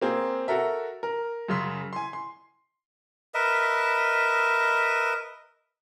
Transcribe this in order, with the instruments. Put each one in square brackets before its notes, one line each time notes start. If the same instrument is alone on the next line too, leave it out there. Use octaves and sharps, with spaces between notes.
[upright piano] A#3 C4 G#4
F#4 A4 A#4 E5
A#4
F#2 C#3 C6 B6
G#5 C6
C6
[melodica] A#4 B4 D#5 E5